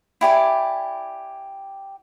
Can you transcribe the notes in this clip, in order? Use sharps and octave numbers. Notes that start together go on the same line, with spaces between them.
E4 G4 D5 G#5